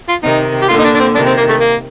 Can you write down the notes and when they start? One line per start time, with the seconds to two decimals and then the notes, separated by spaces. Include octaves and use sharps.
0.08 F4
0.23 C3 D#3 D#4
0.62 G4
0.69 A#2 D3 F4
0.79 D#4
0.84 D4
0.94 D4
1.00 C4
1.14 C3 D#3 D4
1.26 C4
1.37 A#3
1.49 A3
1.60 A#3